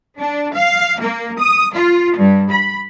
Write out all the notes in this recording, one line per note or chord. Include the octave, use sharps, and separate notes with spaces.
D4
F5
A#3
D#6
F4
G2
B5